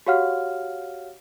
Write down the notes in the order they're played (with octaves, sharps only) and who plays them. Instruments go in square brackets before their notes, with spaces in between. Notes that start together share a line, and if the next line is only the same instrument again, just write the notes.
[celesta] F#4 G4 C#5 F5 F#5 F6